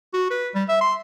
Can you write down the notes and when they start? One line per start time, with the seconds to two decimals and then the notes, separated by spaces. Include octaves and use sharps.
0.14 F#4
0.31 B4
0.55 G3
0.69 E5
0.81 C6